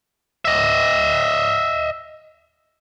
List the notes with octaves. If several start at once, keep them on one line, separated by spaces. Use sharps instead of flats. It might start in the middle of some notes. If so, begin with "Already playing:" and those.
D#5 E5